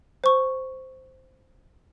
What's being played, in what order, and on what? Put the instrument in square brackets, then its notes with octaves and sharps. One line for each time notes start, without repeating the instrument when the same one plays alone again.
[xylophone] C5 C#6